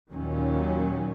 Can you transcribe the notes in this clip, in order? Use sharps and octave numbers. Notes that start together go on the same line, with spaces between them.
D#2 A#2 D#3 F#3 C#4